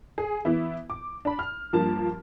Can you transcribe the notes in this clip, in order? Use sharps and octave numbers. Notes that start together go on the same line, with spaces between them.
G#4
E3 B3 E4
D6
D4 B5
F6
G2 F3 A#3 A5